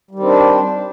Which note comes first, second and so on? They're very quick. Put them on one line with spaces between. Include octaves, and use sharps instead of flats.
G3 D#3 C4 D4